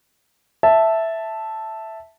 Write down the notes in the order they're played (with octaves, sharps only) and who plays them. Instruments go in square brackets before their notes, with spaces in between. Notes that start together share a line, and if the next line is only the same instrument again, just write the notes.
[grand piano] E5 A5